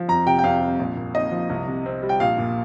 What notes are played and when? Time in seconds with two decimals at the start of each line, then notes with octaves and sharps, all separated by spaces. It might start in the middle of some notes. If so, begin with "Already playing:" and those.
Already playing: F3
0.08 F2 A#5
0.26 C3 G5
0.39 G5
0.44 F2 F5
0.62 G3
0.79 A#1
0.96 A#2
1.14 D#4 D#5
1.32 F3
1.50 C2
1.67 C3
1.86 C4
2.03 G3
2.09 G5
2.20 A#1 F5
2.38 A#2